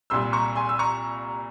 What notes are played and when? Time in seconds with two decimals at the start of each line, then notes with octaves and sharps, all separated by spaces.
0.10 C2 A#2 G3 C6 E6
0.33 A#5 C#6
0.55 G#5 C6
0.69 E6
0.79 A#5 C#6